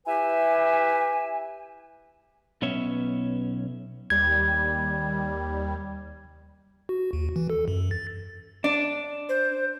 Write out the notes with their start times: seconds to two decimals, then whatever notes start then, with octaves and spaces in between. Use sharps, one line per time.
0.07 E4 G4 B4 E5 G#5
2.62 B1 B3 C#4 C#5 E5
4.10 D#2 G3 G#6
6.89 F#4
7.13 D#2
7.36 E3
7.50 A4
7.68 F#2
7.91 A6
8.64 D4
9.29 C5